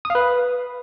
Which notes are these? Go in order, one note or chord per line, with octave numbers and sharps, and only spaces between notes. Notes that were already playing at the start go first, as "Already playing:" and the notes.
D#6
F5
B4